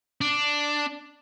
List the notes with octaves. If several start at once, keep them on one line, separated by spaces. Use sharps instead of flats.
D4